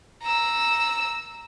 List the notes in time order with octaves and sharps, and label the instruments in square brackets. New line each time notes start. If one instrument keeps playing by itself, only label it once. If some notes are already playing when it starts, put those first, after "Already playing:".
[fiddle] A#5 E6